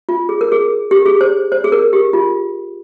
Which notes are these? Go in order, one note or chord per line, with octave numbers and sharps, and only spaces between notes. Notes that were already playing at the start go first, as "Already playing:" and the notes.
F4
G#4
A#4
G#4
G4
G#4
C5
C5
G#4
A#4
G4
F4